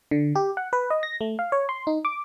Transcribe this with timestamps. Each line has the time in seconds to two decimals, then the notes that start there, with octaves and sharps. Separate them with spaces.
0.11 D3
0.35 G4
0.57 F#5
0.73 B4
0.90 D#5
1.03 A#6
1.21 A3
1.39 F5
1.52 C#5
1.69 C6
1.87 D#4
2.05 D6